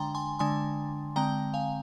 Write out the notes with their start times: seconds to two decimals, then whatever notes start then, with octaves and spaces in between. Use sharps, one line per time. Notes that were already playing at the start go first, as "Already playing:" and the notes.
Already playing: D3 G#3 D4 G5 A#5 C6
0.15 G#5 C6
0.39 D3 G#3 D4 G#5 C6
1.16 D3 G#3 C4 G5 A#5
1.54 F5 G#5